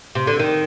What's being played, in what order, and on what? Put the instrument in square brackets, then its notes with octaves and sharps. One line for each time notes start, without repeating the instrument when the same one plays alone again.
[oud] C3
D3
D#3